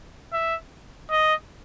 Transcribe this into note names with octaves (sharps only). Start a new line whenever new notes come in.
E5
D#5